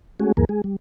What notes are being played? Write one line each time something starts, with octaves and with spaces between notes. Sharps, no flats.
G#3 A3 C#4 F#4 G#4
D2 G2 E3 A#3 G#4 A#4
G#3 G#4
G3